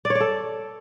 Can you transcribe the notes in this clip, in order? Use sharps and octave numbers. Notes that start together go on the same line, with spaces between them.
D5
C#5
D5
A4